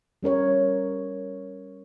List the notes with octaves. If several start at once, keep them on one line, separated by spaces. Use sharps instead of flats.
G3 C#4 A#4 C#5